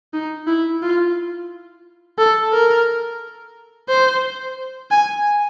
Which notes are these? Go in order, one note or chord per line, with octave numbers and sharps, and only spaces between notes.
D#4
E4
F4
A4
A#4
C5
G#5